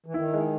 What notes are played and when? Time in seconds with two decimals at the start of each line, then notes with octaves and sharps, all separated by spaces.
0.06 E3
0.14 D#3 E4
0.33 G#3